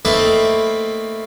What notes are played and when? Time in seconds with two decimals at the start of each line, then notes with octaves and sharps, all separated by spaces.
0.05 A3 A#3 C4 D#4 B4 E5